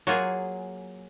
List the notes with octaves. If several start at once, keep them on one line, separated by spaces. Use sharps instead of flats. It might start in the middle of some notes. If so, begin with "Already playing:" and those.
F#3 A#3 F4 G#4